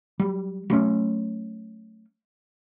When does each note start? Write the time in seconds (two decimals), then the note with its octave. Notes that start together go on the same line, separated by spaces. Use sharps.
0.19 F#3 G3
0.70 F#3 A3 C#4